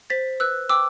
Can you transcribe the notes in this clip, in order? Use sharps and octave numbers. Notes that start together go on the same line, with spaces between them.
C5 A6 B6
B4 E6 F#6
G5 D6 E6